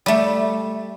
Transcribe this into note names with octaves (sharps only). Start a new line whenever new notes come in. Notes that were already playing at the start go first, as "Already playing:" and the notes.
G3 A3